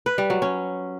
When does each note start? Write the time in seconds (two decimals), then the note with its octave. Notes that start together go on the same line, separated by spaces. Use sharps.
0.06 B4
0.18 G3
0.30 F#3
0.42 C#4